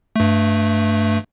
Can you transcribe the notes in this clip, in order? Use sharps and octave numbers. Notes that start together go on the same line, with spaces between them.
G2 A3